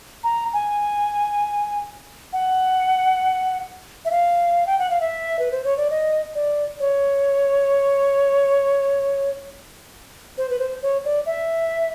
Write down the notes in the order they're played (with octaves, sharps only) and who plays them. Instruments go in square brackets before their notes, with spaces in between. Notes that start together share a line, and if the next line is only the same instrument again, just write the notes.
[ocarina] A#5
G#5
F#5
E5
F5
G5
F#5
F5
E5
B4
C5
C#5
D5
D#5
D5
C#5
C5
B4
C5
C#5
D5
E5